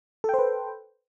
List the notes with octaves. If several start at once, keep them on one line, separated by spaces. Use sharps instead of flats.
A4 B4 C5 G5